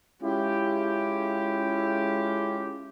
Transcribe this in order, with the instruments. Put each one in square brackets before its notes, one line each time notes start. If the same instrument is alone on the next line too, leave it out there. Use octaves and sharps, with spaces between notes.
[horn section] G#3 C#4 E4 F4 G4